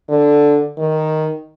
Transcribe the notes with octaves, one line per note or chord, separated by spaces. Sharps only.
D3
D#3